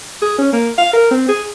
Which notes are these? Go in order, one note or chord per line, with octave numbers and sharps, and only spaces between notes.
G#4
C#4
A#3
F5
A#4
C4
G#4